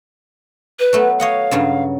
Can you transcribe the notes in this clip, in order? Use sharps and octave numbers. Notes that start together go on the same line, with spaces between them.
B4
F#3 A3 B3
C#5 D#5 F5 F#5
G2 C#3 F#3